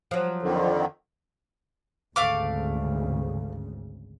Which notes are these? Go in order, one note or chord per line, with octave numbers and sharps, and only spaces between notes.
F3 F#3
F2 D3 D#3
G#1 D2 C#3 A3 F5 D6